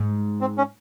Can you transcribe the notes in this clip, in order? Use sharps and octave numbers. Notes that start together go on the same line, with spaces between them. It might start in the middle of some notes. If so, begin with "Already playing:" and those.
Already playing: G#2
C4
C#4